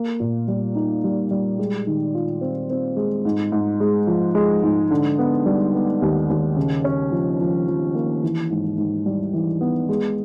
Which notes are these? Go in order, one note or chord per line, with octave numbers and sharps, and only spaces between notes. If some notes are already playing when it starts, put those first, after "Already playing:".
Already playing: A#3
A#2
G3
D#4
G3
G3
G#3
D#3
F4
C4
C4
G#3
G#2
G#2
G#3
F3
G#3
G#2
D3
B3
G3
B3
D#2
D#2
C#3
C#4
F3
F3
F3
A#3
E3
G#2
G#2
G3
E3
B3
G#3